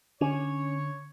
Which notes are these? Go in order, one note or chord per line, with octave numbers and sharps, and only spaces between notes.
D3 C#4 C#5